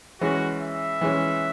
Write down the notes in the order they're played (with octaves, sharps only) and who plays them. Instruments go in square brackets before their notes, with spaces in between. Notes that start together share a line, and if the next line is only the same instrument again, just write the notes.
[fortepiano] E3 G#3 C#4 [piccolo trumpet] F#4
[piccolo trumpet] E5
[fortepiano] E3 G#3 C#4